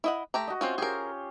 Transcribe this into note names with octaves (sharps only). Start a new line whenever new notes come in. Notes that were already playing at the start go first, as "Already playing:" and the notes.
E4 D#5 F#5
A3 G4 A#5
F#4 D#5
C4 C#4 F4 C5 E5
C#4 F4 G4 G#4 A#4